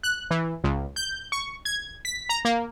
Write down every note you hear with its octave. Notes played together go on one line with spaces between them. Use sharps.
F#6
E3
C#2
G6
C#6
G#6
B6
A#5
A#3